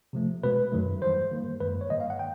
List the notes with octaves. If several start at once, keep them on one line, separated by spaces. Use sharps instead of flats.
C3 F3 A3
B2 G#3 B4
F#2 D#3 F#3 A3
G2 E3 G3 C5
G2 D#3 G3 A#3
F#2 D#3 G#3 B4
C#5
G2 D#3 G3 A#3 D#5
F5
F#5
G5